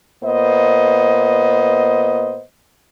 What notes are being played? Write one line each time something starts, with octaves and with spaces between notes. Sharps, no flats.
A#2 B3 C5 D#5